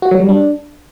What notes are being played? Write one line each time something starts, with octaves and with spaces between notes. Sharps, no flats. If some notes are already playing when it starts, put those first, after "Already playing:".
F#4
F#3
G3
D4